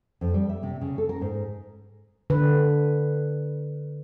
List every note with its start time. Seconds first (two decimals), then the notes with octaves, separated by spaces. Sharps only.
0.21 F2
0.34 G3
0.49 E5
0.63 C3
0.81 C#3
0.98 A4
1.09 A#4
1.21 G#2
2.30 D3 B4